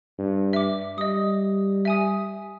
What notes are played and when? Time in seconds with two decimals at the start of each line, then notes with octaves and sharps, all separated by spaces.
0.19 G2
0.53 E5 D6
0.98 G3 D#5 D#6
1.85 E5 G#5 D#6